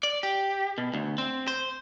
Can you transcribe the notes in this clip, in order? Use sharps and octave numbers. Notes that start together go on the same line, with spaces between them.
D5
G4
B2
D2
C4
C5